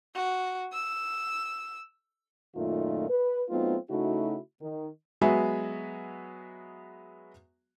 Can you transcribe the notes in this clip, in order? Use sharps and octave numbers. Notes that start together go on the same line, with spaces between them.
F#4
E6
F#2 A#2 D#3 A3 D#4 F4
B4
F#3 A3 B3 C4 D#4 F4
C#3 A3 D#4 E4 F#4
D#3
F#3 G#3 B3 F#4 G#4 E5